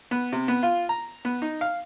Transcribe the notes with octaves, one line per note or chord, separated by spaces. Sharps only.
B3
C3
B3
F4
A#5
B3
D#4
F5